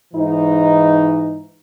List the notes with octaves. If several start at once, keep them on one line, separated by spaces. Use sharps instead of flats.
G#2 E3 D#4